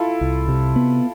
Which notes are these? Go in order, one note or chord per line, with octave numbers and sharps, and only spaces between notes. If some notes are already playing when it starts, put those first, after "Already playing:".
Already playing: E4 F4 A4
C2
C3
B3